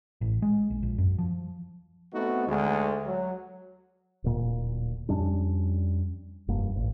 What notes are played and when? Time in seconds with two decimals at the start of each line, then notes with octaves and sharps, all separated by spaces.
0.21 A1
0.42 G#3
0.70 A#1
0.83 A#1
0.98 F#2
1.18 F3
2.14 A3 B3 C4 D#4 F#4
2.47 D2 G#3
3.06 F#3
4.24 D1 A#2
5.09 F2 G3 C#4 D4
6.48 F1 G2 A#3
6.76 A1